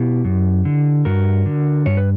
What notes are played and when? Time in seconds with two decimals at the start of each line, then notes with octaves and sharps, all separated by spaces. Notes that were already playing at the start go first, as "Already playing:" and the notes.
Already playing: B2 E4 G4
0.25 F#2
0.65 D3
1.05 G2 F#4 A#4
1.46 D3
1.86 G2 C#5
1.97 B4